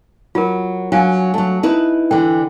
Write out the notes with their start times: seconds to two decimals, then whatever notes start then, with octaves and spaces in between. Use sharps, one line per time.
0.35 F#3 F4 A#4
0.92 F#3 D4 F5 G#5
1.34 F#3 A3
1.63 D#4 E4 B4
2.11 D3 E3 G5